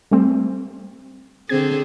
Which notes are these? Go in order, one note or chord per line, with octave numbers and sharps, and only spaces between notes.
G3 A3 C4
D3 C4 G#4 G#6